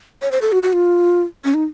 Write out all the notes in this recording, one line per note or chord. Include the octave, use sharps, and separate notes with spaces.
C#5
C5
A4
F#4
F#4
F4
C#4
D#4